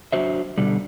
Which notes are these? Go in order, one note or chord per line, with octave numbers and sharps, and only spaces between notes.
F#3 D4 F#4 C5 E5
B2 D3 G3